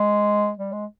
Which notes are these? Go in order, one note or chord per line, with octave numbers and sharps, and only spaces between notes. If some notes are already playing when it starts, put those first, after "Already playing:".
Already playing: G#3
G3
G#3